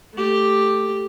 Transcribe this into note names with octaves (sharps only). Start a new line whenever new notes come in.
A3 G4